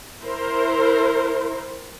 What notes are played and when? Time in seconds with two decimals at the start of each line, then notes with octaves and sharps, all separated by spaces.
0.24 E4 A#4 C5